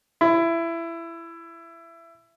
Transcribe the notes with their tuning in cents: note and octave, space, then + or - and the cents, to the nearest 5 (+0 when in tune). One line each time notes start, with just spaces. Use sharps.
E4 +20